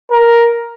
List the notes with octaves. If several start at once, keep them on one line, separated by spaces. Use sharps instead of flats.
A#4